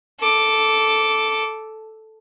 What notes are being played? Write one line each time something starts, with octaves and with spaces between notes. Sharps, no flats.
A4 D6